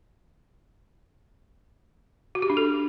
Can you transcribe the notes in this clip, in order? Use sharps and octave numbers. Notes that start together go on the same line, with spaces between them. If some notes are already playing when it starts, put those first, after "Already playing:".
F#4
G4
D4
A4